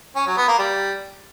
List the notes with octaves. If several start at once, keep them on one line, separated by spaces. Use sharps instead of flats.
C#4
F#3
B3
A#3
G3